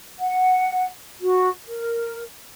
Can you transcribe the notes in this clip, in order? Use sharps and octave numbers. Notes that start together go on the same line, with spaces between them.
F#5
F#4
A#4